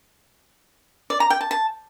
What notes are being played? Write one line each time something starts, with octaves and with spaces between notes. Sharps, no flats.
D5
A#5
G5
A5
A5